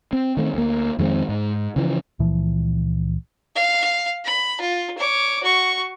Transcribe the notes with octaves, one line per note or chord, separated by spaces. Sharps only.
C4
D#3 A3 C4
D2 A#3
F2 D#3 G#3 C4
G#2
C#3 E3 F3
C#2 A#2 E3 F3
F5
B5
F4
C#5 D6
F#4 C#6